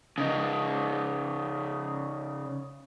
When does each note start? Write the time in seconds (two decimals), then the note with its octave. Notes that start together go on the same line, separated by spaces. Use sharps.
0.18 C#3 D#4